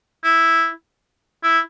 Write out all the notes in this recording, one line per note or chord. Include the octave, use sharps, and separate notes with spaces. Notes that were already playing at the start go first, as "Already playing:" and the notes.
E4
E4